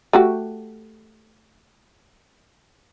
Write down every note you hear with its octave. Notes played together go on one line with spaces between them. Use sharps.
A3 F#4 G4